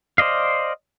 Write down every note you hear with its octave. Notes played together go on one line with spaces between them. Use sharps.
C5 D5 D#5 F5